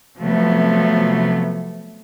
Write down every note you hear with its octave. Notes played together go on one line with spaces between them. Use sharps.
C3 F3 F#3 A3 B3